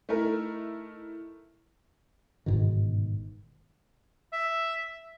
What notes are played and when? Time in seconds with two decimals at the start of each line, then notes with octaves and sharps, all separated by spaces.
0.09 A3 D#4 E4 A#4
2.46 G1 G#2 B2 D#3
4.33 E5